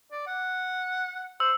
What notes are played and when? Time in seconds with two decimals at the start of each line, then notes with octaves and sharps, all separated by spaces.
0.11 D5
0.27 F#5
1.40 C5 E6